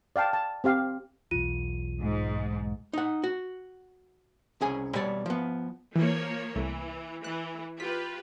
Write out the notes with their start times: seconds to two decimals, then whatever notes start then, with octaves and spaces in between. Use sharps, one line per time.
0.16 D5 F5 G5 A5
0.33 A5
0.64 C4 G4 F5
1.31 B1 E2 F4 D#7
2.01 G#2
2.93 D#4 F#5
3.24 F#4
4.61 C2 C#4 G#4 G#5
4.95 B2 G3 C#5 D5
5.26 F3 B3
5.96 E3 F3 A#3 C#5
6.55 C2 E3 A3
7.24 E3 F#6
7.80 F4 G4 B4 B6